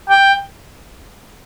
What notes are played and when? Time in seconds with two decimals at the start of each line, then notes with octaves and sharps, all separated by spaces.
0.10 G5